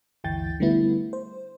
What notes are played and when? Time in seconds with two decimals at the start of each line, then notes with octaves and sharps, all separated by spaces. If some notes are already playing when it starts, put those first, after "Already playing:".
0.24 G1 D2 E3 G5 G6 A6
0.60 D3 G3 A3 B3 E4
1.13 C5